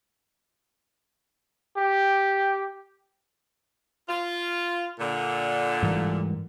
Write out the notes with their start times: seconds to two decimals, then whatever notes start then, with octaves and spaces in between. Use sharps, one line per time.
1.77 G4
4.09 F4
5.00 A#2 D3
5.83 G#2 E3 G3